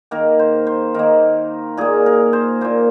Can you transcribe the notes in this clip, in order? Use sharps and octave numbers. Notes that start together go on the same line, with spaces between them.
D#3 A#3 A#4
C5
C5
D#3 A#3 A#4
A#2 A#3 G#4
A#4
C5
A#2 A#3 C5